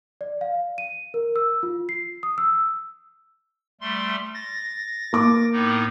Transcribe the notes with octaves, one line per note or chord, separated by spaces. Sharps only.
D5
F5
D#7
A#4
E6
F4
C7
D#6
E6
G3 A3 C6
A6 A#6
A#3 D6
A2 B3 D#4